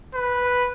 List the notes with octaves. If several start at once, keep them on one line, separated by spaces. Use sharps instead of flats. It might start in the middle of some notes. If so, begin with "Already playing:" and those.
B4